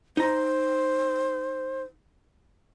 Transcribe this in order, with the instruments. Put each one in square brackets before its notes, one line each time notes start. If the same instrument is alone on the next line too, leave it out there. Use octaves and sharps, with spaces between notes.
[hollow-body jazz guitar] D#4 A#5 [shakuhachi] C5